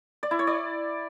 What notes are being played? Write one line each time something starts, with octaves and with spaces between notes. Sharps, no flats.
D5
E4
C#5
D5